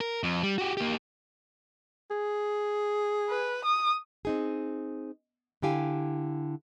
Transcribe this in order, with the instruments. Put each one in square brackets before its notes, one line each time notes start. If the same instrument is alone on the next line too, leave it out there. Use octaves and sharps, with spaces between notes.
[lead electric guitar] A#4
F2
G3
F#4 G4
A#3 G4
[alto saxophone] G#4
[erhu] B4
D#6
[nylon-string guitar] C4 D#4 G#4
D3 E4 G4 F5 G#5